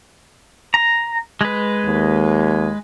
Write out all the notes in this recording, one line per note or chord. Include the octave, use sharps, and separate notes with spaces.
A#5
G#3 B4
D#2